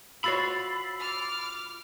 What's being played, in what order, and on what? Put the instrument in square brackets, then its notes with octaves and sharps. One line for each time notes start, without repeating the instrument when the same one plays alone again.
[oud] F4 F#4 C#5 [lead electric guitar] B5 [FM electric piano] E6 A6 C7
[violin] D6 F6